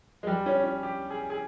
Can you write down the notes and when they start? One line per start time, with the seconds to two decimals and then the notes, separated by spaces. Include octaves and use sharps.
0.23 G#3
0.27 G3
0.46 C#4
0.64 C#4
0.83 G4
1.10 G#4
1.30 G#4